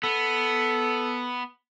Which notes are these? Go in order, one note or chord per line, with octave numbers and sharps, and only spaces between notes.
B3 A4